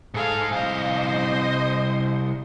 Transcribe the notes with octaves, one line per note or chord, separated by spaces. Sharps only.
G#2 G#4 A4 F5
C2 C5 D#5 F5